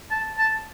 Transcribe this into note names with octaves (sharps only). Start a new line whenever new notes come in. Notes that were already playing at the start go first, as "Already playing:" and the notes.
A5
A5